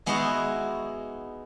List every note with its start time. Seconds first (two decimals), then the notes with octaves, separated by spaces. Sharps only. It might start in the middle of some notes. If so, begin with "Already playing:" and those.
0.06 G#3 B3 D#4 E4 F#4 D#5